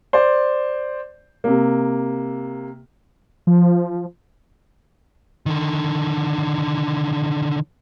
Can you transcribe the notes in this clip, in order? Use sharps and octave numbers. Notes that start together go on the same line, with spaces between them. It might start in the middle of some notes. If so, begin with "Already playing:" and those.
C5 D5
C3 A#3
F3
D3 D#3